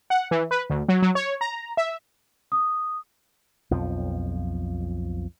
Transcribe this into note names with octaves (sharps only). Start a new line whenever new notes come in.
F#5
E3
B4
D2
F#3
F#3
C#5
A#5
E5
D#6
B1 F2 F3